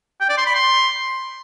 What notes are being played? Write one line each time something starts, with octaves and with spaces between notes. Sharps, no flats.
G5
D5
C6
B5
C6